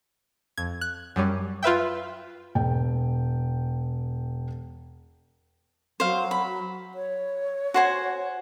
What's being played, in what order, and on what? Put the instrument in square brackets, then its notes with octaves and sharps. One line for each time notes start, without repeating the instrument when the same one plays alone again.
[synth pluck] F2 G#6
F#6
F#2 G3 C#4
F4 B4 E5 G5
[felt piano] E1 G5
[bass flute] F#3 [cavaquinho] C5 F5
[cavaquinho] B5
[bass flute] C#5
[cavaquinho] F#4 C5 G#5